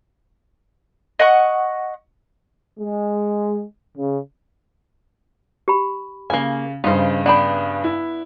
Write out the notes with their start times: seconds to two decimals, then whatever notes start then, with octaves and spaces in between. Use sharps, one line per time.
1.19 D#5 F#5 C#6
2.79 G#3
3.97 C#3
5.68 G4 B5
6.30 C#3 A#3 G#5
6.84 G2 C#3 D#4 C5
7.26 B3 D4 D5 G5 B5
7.84 E4